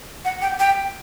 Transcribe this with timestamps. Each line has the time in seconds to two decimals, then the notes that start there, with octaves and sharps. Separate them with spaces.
0.25 F#5
0.42 G5
0.59 G5